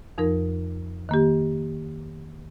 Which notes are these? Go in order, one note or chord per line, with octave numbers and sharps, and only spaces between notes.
F2 F3 D#4 A#4
D#3 A#3 G4